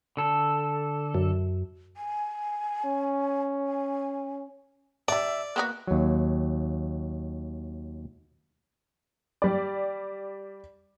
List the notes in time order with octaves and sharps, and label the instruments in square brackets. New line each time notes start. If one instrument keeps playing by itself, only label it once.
[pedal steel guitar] D3 A4
[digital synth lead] F#2
[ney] G#5
[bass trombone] C#4
[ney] G#5
[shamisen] G3 D4 [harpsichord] D5 [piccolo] E5
[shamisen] A#3 B3 F#4 [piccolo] F#6
[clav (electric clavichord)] D#2 F#3
[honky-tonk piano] G3 D5